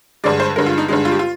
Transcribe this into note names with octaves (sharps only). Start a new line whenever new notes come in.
G2 D3 G#3 D5
C5
G2 D3 G#3 A#4
F4
D#4
G2 D3 G#3 D#4
F4
G4
F4